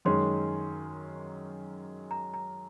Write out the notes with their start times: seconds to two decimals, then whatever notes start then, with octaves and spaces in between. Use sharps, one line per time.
0.05 F#2 D#3 G#3 C#4 C6
2.11 A#5
2.34 A#5